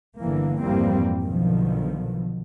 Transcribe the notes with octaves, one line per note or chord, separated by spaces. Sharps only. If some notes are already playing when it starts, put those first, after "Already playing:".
G1 D3 E3 A#3
G#1 F2 E3 G3 A#3 C4
B1 B2 D3 D#3 F3